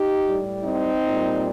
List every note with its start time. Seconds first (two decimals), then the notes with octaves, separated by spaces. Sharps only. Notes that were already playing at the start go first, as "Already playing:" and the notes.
Already playing: D#4 G4
0.25 A2 G3
0.65 C4 D#4
1.05 A#2 G3